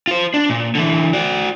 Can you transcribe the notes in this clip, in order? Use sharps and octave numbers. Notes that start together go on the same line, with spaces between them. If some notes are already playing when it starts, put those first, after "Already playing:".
F4 C5
D4
A#2
D3 E3
F#4 D5